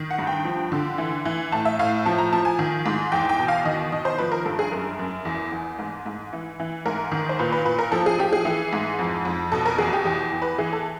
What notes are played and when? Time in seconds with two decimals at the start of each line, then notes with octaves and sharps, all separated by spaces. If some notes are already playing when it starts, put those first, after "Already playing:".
Already playing: D#3
0.10 F#5
0.19 G2
0.27 G5
0.45 F3
0.72 D3
0.98 E3
1.25 E3
1.52 A2 A5
1.65 E5
1.79 A2 F5
2.06 F3 A5
2.18 A#5
2.33 F3 A5
2.45 G#5
2.59 D#3
2.86 G#2
3.12 E2 G5
3.29 G5
3.39 B2
3.48 F5
3.65 D#3 D#5
3.92 D#3 D#5
4.05 C5
4.18 F3 B4
4.32 A#4
4.46 G2 A4
4.59 G#4
4.72 F#2 A#4
4.99 F#2
5.25 E2
5.52 E2
5.79 G#2
6.06 G#2
6.33 E3
6.60 E3
6.86 G#2 A#4
7.12 D#3
7.29 C5
7.39 A#2 B4
7.52 B4
7.65 A#2 B4
7.79 A#4
7.92 F3 A4
8.06 G#4
8.19 F3 G4
8.33 G#4
8.45 E3
8.73 G#2
8.99 F2
9.25 F2
9.52 B2 A4
9.66 A#4
9.78 E2 G#4
9.93 G4
10.05 E2 G4
10.32 E2
10.42 B4
10.58 E3 G#4
10.73 A4